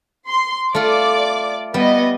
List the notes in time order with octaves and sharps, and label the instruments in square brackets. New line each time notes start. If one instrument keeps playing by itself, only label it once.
[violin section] C6
[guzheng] A3 F4 [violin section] D5 D6
[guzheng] G3 [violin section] B3 D#5